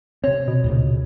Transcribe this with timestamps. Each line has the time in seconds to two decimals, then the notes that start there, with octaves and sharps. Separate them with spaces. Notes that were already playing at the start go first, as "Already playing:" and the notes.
0.24 C3 C4 C#5
0.48 B2
0.64 D2 A#2 C#3